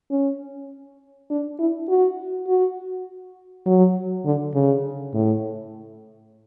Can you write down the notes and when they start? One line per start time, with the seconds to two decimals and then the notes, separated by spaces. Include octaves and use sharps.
0.11 C#4
1.30 D4
1.59 E4
1.89 F#4
2.48 F#4
3.66 F#3
4.25 D3
4.55 C#3
5.14 A2